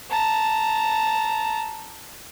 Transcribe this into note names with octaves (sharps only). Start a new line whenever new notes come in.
A5 A#5